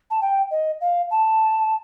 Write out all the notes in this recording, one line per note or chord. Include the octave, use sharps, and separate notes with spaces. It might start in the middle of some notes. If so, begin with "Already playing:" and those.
A5
G5
D#5
F5
A5